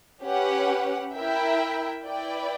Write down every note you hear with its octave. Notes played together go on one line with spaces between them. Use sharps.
C#4 G4 B4 F#5
E4 A#4 E5 G5
E4 B4 D5 G5